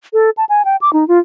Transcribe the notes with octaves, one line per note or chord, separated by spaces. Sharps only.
A4
A5
G#5
G5
D6
D#4
F4